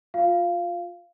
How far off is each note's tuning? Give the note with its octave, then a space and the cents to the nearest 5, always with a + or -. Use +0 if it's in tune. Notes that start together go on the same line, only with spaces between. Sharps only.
F4 +20 F5 -15